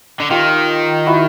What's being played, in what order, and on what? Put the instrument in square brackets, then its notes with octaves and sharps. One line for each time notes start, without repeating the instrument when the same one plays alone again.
[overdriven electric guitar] D3
[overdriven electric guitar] D#3 [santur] F4 G4
[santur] E4 F#4